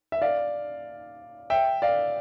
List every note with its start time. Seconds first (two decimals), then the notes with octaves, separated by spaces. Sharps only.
0.12 E5
0.22 D5 F5
1.50 E5 G5
1.82 D5 F5